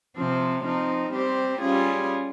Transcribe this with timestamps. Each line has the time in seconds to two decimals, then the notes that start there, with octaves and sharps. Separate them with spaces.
0.17 C3 F3 C4
0.65 F3 C4 D#4
1.12 G3 C4 G4 C5
1.59 G3 C#4 F4 G#4